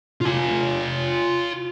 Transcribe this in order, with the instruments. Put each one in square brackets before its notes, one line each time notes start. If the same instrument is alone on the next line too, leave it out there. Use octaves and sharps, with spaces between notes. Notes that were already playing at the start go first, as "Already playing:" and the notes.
[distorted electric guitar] F4 G#5